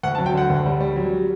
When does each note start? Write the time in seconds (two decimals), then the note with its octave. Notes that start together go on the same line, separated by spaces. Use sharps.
0.03 D2 F#5
0.15 A5
0.18 F#3
0.26 G5
0.34 D3 F#5
0.50 D2
0.66 G3
0.80 G3
0.96 F#3